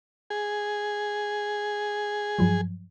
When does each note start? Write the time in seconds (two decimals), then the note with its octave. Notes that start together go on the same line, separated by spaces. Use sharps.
0.30 G#4
2.39 G2 F3 F#3